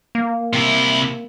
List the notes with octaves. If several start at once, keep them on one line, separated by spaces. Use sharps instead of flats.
A#3
C3 E4